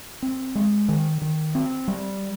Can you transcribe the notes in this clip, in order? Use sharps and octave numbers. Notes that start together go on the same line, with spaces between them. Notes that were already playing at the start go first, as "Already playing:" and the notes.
C4
G#3
D#3
D#3
C4
G3